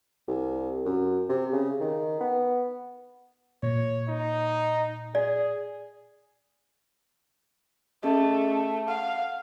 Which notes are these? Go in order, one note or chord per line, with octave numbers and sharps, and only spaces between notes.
C2
F#2
C3
C#3
D#3
B3
A#2 C#5
D#4
G#4 D5
A3 C#4 G#4 D#5
F5 F#5